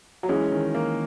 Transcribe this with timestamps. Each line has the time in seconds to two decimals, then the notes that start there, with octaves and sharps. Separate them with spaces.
0.23 F#3
0.29 E3 G#3 C#4
0.52 D#3
0.74 A#3